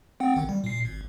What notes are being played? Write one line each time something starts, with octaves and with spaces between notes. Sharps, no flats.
C4 F#5 G5
A1 D#3
G3
A#2 C7
G#1